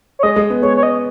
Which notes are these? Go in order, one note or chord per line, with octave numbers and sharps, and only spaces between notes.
C#5
G#3 D#5
G#3
B3
G#3 C#5
C#5
D#5